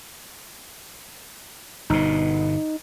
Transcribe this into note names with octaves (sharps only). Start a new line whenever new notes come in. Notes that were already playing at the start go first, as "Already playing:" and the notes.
G1 B2 D#4